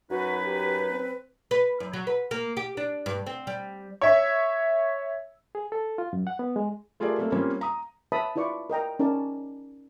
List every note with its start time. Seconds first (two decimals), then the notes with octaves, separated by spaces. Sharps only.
0.11 F#2 D#4 F#4 B4
0.46 G4
0.91 C4
1.51 B4
1.80 F#2
1.93 F#3
2.07 B4
2.31 A#3
2.57 G4
2.77 D4
3.06 G2
3.26 C4
3.47 G3
4.01 C#5 E5
5.55 G#4
5.72 A4
5.98 F4
6.13 F#2
6.27 F#5
6.39 B3
6.56 G#3
7.00 A3 F4 G4 G#4 A#4 D5
7.19 A3 A#3 C4
7.32 G3 A#3 C4 C#4 F4
7.61 A#5 D#6
8.12 B4 C#5 E5 A5 B5 D#6
8.36 E4 F4 B4 D5 C#6
8.70 A#4 D#5 G5 A#5
8.99 C#4 D#4 A#4 D5 A5